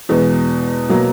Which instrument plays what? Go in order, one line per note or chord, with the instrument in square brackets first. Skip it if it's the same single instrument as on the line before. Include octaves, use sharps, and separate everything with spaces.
[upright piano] E2 B2 G#3 B3
B2 F#3 A#3